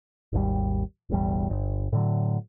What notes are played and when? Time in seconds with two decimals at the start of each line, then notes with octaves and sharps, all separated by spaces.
0.33 G#1 D#2 D3 G3
1.10 E1 A1 E2 G3
1.50 G1
1.93 A2 D3 F#3